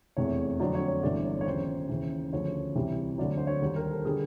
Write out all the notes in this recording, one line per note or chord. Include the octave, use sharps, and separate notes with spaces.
F1 E2 C3 E3 C#5
F2 D3 F#3 D5
C#5
C#5
G1 G2 E3 D5
C#5
C#5
D#2 C#3 F3 C5
D#2 C#3 E3
D2 C#3 F3 C#5
C2 C3 E3 G3
D2 D3 F#3 D5
C5
C#5
D#2 D#3 G3 C5
A#4
A4
D3 G3 G#4